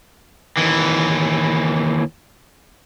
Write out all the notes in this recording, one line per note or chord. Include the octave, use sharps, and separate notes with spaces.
D#2 E3